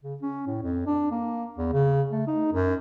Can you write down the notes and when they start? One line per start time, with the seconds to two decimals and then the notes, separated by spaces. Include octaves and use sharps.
0.04 C#3
0.22 C#4
0.46 A2
0.63 F2
0.87 D4
1.11 A#3
1.58 E2
1.73 C#3
2.11 A3
2.27 D#4
2.53 F#2